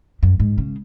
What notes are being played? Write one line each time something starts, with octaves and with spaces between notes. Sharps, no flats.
F#2
G#2
C#3